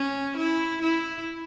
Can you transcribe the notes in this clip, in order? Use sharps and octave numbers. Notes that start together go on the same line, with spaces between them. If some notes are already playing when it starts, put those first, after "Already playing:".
Already playing: C#4
E4
E4